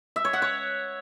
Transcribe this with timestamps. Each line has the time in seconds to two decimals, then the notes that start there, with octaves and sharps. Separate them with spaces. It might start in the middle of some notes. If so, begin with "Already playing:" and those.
0.16 E5
0.25 C#5
0.33 F#5
0.42 C#5